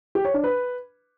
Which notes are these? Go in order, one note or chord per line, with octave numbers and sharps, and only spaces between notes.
G4
C#5
D4
B4